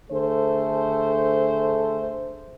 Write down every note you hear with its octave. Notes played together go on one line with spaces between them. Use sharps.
D3 A3 G#4 A4 C5